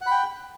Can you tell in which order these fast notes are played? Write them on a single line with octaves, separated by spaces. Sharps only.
F#5 B5 G5